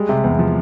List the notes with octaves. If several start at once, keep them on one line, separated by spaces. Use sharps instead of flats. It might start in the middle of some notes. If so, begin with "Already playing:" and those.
Already playing: G3 G#3
C3
E2
F3